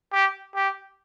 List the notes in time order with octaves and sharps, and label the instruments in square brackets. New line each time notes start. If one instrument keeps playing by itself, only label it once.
[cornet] G4
G4